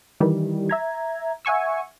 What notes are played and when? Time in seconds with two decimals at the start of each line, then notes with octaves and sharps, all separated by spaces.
0.20 D#3 E3 G3
0.70 E5 A#5 G#6
1.45 E5 F#5 G#5 C#6 E6